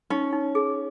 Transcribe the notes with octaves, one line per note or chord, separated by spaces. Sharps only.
C#4 D#4
D#4
G#4